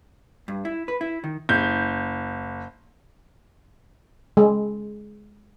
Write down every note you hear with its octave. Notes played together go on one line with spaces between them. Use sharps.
G2
E4
B4
E4
D#3
F#1 G6
G#3